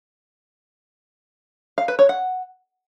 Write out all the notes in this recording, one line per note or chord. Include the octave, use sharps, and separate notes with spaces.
F5
B4
C#5
F#5